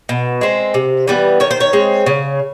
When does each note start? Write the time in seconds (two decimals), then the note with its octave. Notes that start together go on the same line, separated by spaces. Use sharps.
0.09 B2
0.41 G#3 C4
0.74 C3
1.08 E3 G3 B3
1.40 D#3 C#5
1.51 C5
1.60 C#5
1.73 G#3 C4
2.06 C#3